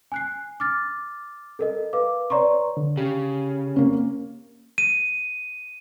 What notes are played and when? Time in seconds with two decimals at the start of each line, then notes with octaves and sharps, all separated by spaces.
0.12 G#5 F#6 C7
0.60 D6 F6 A6
1.59 A4 A#4 D#5
1.93 B4 F5 D6
2.30 B4 C#5 D5 A#5 C6 C#6
2.77 D3
2.97 C#3 G4
3.76 A#3 C#4
4.78 D#7